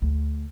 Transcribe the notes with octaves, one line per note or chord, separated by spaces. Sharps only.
D2